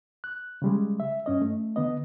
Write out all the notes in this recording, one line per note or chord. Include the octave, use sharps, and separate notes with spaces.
F#6
C#3 G3 G#3
E5
G2 C#4 D#5
A3
D3 B3 D#5